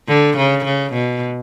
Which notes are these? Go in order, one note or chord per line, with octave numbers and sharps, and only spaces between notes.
D3
C#3
C#3
B2